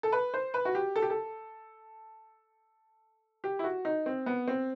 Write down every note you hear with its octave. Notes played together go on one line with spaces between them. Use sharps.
A4
B4
C5
B4
F#4
G4
A4
G4
A4
G4
E4
F#4
D#4
C4
B3
C4